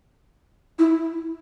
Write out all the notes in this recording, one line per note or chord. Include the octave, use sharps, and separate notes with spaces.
E4